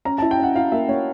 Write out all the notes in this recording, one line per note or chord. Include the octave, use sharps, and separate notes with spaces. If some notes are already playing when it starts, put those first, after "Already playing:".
C#4 A#5
E4 A5
G5
C#4 F#5
E4 F5
A#3 E5
A#3 C#5